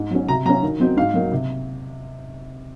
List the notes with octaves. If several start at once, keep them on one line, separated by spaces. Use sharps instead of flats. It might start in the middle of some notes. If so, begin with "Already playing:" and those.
Already playing: G#2
F#3 C#4
C3 A#5
F#3 C#4 A#5
D#3
F#3 C4 D#4
G#2 F5
F#3 A#3 D#4
C3